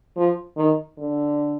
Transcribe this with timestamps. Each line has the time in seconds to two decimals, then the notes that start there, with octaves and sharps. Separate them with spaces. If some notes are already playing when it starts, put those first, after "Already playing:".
0.17 F3
0.57 D#3
0.98 D3